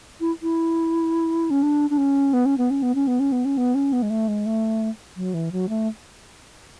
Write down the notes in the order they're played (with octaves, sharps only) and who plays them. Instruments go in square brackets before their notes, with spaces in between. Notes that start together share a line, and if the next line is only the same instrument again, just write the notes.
[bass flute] E4
E4
C#4
D4
D4
C#4
B3
C#4
B3
C#4
B3
C#4
B3
C#4
B3
C#4
B3
C#4
B3
G#3
A3
G#3
A3
F#3
E3
F#3
A3